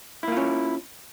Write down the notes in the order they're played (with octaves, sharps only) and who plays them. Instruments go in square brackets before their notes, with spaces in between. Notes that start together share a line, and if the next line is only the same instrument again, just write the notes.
[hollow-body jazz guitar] E4
A#3
F4
C#4